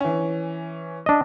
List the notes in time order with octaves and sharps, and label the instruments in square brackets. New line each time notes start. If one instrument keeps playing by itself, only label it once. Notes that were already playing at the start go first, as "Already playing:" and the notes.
[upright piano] E3 C#4
[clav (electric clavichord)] D4 D#5